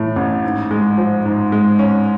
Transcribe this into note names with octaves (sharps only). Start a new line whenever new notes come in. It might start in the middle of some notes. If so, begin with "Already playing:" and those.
Already playing: A2 E3 A3
A1
G#2
G#3
F3
G#2
G#3
C#4